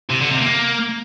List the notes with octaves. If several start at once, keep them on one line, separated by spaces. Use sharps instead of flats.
C3
D3
C3
A#3